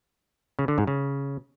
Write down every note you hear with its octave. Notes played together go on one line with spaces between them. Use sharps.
C#3
D3
G#2
C#3